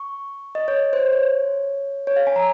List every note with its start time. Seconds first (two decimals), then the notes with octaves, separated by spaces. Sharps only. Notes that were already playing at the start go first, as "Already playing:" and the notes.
Already playing: C#6
0.55 D#5
0.68 C#5
0.93 C5
1.13 C#5
2.07 C#5
2.16 F5
2.27 G#5
2.36 A#5